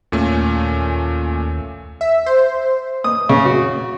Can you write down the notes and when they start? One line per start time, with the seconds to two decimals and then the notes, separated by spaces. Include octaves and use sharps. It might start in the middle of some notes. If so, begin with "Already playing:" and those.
0.12 D#2 A#2 A3 C#4
2.01 E5
2.26 C5
3.04 D#6
3.29 C#3
3.45 F#4